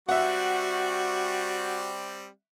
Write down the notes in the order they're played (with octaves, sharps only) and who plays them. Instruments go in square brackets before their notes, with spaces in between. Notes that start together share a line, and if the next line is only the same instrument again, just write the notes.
[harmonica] G3 C4 D5 [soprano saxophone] F#4 [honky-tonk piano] E5 F#5